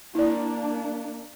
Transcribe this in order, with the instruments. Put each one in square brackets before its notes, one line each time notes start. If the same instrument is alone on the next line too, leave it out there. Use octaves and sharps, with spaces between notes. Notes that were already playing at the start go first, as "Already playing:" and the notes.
[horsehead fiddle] A#3 D4 [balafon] E4 D5